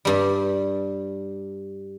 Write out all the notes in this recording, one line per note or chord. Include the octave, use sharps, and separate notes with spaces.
G2 G3